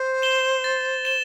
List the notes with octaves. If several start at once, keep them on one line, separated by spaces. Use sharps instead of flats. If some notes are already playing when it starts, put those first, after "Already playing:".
Already playing: C5
E7 G7
A6
E7 G7